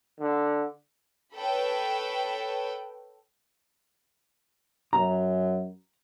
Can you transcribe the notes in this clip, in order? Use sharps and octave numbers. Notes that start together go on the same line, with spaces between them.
D3
A4 B4 C#5 G5 B5
F#2 A#5